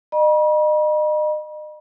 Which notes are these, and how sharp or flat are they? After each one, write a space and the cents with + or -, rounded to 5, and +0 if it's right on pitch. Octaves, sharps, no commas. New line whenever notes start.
D#5 -35 B5 -45